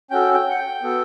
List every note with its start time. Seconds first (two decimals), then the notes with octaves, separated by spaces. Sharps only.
0.11 C#4 F#4 A4 G5
0.34 G5
0.50 F#5
0.58 G5
0.83 B3 F#4 A4